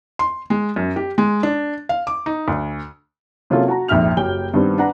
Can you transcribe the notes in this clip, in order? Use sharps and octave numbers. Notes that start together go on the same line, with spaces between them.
C6
G#3
F#2
G4
G#3
D4
F5
D6
D#4
D2
C3 F#3 A#3 C#4 F4 A4
F#4 A5 A#5
A#1 F2 G#2 E5 F6 F7
F#1 F#3 G4 G5 G7
G2 D#3 G3 B3 C4
D4 B4 F#5 A#5